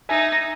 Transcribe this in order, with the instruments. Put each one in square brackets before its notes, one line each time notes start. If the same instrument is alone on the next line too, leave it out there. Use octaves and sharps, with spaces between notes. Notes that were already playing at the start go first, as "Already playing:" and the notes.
[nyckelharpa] D#4 [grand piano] E5 G#5